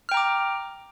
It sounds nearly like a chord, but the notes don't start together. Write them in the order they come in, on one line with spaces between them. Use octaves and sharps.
F6 G5 A#5 D6